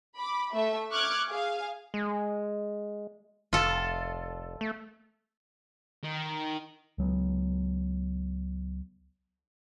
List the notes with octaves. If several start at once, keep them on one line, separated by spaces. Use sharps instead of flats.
B5 D6
A3 E5
C#6 D6 F6 F#6 G#6
G#4 F5
G#3
F1 F4 A4
A3
D#3
C#2 F#3 B3